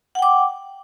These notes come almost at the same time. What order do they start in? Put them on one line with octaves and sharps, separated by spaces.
F#5 G5 D6